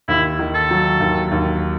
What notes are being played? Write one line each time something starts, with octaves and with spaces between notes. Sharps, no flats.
D#2 E4
D#3
A4
F#3
D#2
D#2